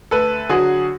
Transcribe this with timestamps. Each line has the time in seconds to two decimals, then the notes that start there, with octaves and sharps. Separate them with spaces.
0.11 D2 A4 B4
0.49 D3 F#3 F#4 G#4